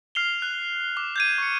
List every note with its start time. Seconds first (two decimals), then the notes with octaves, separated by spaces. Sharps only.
0.15 F6 C7 F7 G7
0.42 F#6
0.97 D6
1.16 G6 G#6 D#7
1.38 C#6 C#7